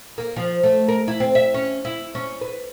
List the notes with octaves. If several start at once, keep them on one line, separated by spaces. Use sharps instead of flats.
A#3
F3
A3
A#4
E4
C4
E5
C#4
E4
C#4
B4